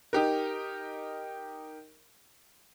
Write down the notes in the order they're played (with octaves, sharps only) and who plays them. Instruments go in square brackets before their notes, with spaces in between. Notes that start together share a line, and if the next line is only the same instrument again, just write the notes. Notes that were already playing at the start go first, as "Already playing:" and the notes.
[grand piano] D#4 G4 A#4